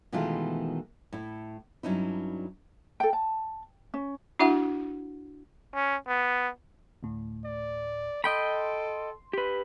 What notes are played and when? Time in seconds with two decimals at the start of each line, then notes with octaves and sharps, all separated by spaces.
0.12 B2 D#3 E3 G#3 A3 F4
1.13 A2 E4
1.83 G2 F#3 C#4 D#4 E4
3.00 A4 G5
3.13 A5
3.94 C#4
4.39 D4 E4 F#4 E5 F#5
5.75 C#4
6.08 B3
7.03 D2 A2
7.45 D5
8.24 A4 D#5 G5 B5 C6
9.33 G4 B4